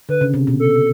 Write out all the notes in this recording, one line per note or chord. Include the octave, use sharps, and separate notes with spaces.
D3 B4
C#3
C3
B2
A4